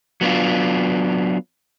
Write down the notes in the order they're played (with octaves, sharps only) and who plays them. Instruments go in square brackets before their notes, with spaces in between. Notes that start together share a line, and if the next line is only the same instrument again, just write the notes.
[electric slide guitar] F#3 B3 D4 F4